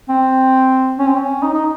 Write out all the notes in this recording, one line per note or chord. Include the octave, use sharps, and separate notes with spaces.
C4
C#4
C4
C#4
D#4
D#4